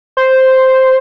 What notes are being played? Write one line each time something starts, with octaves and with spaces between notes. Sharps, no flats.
C5